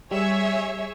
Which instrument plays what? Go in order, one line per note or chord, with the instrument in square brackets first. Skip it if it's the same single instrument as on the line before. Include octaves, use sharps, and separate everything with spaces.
[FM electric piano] G3 [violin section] G#4 C#5 E5